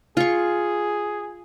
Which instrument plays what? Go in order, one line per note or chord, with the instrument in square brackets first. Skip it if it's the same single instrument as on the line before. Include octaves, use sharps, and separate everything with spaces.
[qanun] F4 C#6 [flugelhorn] G#4